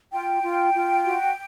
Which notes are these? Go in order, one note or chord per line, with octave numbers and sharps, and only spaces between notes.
F4 G5
F4
F4
F#4